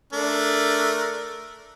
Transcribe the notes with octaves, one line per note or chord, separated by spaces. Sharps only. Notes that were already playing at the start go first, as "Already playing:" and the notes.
A3 D4 A#4